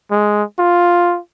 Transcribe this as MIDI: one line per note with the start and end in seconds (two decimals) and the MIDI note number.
0.11 0.43 56
0.59 1.19 65